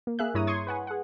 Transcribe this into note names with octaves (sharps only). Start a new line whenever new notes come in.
A#3
A#3 G#4 E5 F#6
G2 E4 C#5 A#5 D#6
C6 C#6 D#6 G#6
B4 F#5 G#5
G#4 F#5